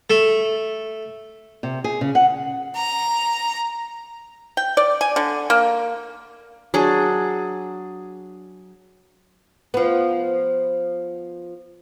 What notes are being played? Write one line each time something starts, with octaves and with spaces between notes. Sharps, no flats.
A3
C3
G#4
C#3
F#5
A#5
G5
D5
G#5
D3
A#3
F#3 D4 G#4
F3 B3